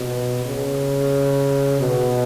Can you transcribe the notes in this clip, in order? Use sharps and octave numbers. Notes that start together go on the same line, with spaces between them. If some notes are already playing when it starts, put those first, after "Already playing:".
Already playing: B2
C#3
B2